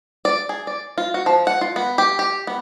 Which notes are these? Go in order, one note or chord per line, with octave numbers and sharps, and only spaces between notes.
D5
G#4
D5
F4
F#4
F3
F#5
F4
B3
G4
G4
B3